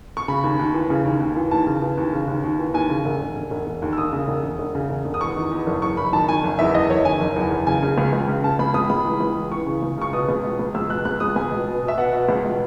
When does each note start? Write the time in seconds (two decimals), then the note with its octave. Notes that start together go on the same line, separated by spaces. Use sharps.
0.17 C#6
0.28 C#3 B5
0.44 D#2
0.59 D#2
0.74 E3
0.90 C#3
1.05 D#2
1.20 D#2
1.36 E3
1.51 D#2 A5
1.67 C#3
1.82 E3
1.98 D#2
2.13 C#3
2.28 D#2
2.43 D#2
2.59 E3
2.74 D#2 G#5
2.90 C#3
3.05 E1
3.21 E1
3.36 E1
3.51 E1
3.67 E1
3.82 D#2
3.93 E6
3.98 E1 D#6
4.13 C#3
4.28 E1
4.44 E1
4.59 E1
4.75 C#3
4.90 E1
5.05 E1
5.14 D#6
5.21 E2 C#6
5.36 D#3
5.51 E2
5.66 F#1
5.82 F#1 C#6
5.97 F#1 B5
6.13 D#3 A5
6.28 D#3 G#5
6.43 F#1
6.59 E2 E5
6.74 F#1 D#5
6.90 F#1 C#5
7.05 D#3 G#5
7.20 F#1
7.36 E2
7.52 F#1
7.67 C#3 G#5
7.83 C#3
7.98 C#2
8.13 C#2
8.28 C#3
8.44 C#3 A5
8.59 C#2 B5
8.74 C#2 D#6
8.90 C#2 B5
9.05 E3
9.20 C#2
9.36 E3
9.51 E3 C#6
9.67 C#3
9.82 C#2
9.97 C#3 C#6
10.13 B2 D#6
10.29 C#2
10.44 B2
10.59 C#2
10.75 C#2 E6
10.90 B2 F#6
11.05 C#2 F#6
11.20 C#2 D#6
11.36 C#2 G#5
11.52 B2
11.67 B2
11.82 B2
11.88 E5
11.98 B2 F#5
12.13 B2
12.29 C#2
12.44 B2